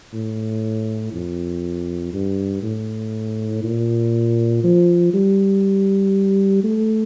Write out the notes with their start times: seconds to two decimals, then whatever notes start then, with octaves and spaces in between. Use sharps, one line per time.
0.13 A2
1.13 F2
2.13 G2
2.63 A2
3.64 A#2
4.64 F3
5.14 G3
6.64 A3